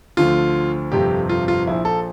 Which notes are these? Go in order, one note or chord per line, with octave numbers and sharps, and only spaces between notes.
D2 D3 F3 F4
G1 F2 C3 G4
F4
F4
A#1 A#2 F3 E4
A4